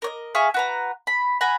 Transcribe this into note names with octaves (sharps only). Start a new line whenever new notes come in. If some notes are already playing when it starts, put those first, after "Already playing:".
A#4 C#5 D#5
G#4 E5 F5 C#6
F#4 B4 A#5
B5
F#5 G#5 A#5 B5